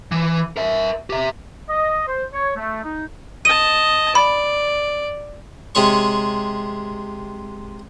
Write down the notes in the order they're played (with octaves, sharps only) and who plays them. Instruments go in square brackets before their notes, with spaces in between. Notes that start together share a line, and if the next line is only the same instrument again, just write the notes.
[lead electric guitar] E3
A#4 E5
G4 E5
[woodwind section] D#5
C5
C#5
A3
D#4
[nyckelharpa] D#5 A5 [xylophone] D#7
[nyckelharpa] D5 [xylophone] B5
[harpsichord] C3 G#3 C#5 C#6